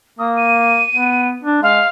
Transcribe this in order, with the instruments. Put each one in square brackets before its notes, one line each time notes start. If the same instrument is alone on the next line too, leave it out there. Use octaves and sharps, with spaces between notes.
[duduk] A#3 [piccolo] D#6
[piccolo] D#7
[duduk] B3
D4
[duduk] G#3 [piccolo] F5